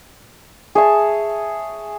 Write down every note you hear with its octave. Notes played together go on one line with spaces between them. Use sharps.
G#4 C#5 E5 A5